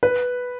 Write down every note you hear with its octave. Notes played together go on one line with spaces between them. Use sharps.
B4